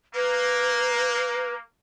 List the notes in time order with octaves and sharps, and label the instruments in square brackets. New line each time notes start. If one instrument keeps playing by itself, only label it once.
[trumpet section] A#3 [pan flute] B4